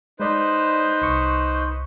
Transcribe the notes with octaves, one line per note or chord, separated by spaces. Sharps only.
G#3 D#4 B4 C5 D5
C2 C#6